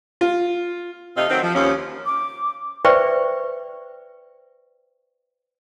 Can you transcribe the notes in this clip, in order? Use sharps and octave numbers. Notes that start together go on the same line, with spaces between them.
F4
C3 A3 C4 D#4 D#5 F5
D#3 F#3 A3 C4
F3
D#2 F3 C#4
D6
B4 C5 D5 E5 G5 C#6